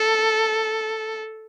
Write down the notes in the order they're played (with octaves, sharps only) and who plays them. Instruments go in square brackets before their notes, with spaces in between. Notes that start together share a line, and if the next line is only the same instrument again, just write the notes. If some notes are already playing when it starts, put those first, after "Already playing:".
Already playing: [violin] A4